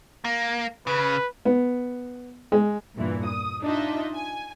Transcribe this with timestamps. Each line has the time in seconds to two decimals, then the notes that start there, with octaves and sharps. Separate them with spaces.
0.25 A#3
0.87 C#3 B4
1.45 B3
2.52 G#3
2.95 E2 G2 A#2 E3
3.24 D#6
3.62 D4 D#4 F4 D#5 E5
4.14 G#5